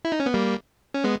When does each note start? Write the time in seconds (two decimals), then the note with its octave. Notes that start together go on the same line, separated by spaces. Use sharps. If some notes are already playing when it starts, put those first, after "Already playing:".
0.05 E4
0.12 D#4
0.20 C#4
0.26 B3
0.34 G3 A#3
0.94 C#4
1.04 G#3 B3